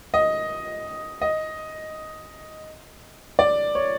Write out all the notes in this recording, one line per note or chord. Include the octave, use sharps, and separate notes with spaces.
D#5
D#5
D5
C#5